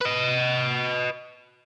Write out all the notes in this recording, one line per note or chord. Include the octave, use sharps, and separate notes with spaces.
B4 D#5